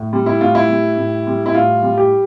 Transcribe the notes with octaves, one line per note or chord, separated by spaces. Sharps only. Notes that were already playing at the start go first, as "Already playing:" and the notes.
Already playing: A2
G3
E4
A2 F4
E4
G3
A2
G3
E4
A2 F4
G3
G4